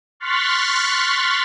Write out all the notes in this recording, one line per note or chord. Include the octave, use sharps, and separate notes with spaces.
C6 C#6 F6 F#6 A6 B6